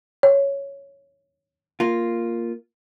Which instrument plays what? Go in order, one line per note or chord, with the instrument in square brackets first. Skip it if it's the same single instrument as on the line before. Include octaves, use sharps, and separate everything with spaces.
[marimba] C#5
[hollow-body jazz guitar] A#3 F4